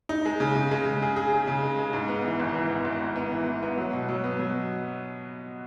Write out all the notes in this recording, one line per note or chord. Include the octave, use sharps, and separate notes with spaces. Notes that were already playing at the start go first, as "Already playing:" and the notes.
D#4
G#3
C#3
C#3
G#3
C#3
G#4
G#4
G#4
C#3
G#3
G#3
G#2
B3
E3
G#1
E3
B3
G#1
G#1
B3
E3
E3
B3
F#3
B2
F#3
B3
F#3